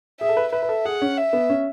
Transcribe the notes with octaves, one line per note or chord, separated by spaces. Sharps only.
G#4 E5
A4
B4
B4 E5
B4
A4
G#4 F#5
C#4
E5
B3
C#4